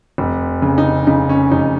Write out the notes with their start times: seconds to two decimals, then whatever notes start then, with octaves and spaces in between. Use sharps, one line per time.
0.18 F1
0.62 C#3
0.78 D#4
1.07 C#3 D#4
1.29 C#4
1.51 F1 D#4